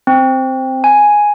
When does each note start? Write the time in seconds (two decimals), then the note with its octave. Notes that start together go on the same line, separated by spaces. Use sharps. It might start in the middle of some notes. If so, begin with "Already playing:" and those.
0.07 C4
0.84 G#5